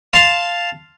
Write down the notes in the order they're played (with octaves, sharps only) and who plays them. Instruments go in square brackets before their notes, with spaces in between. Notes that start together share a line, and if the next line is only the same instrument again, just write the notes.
[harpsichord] F5 A5 C6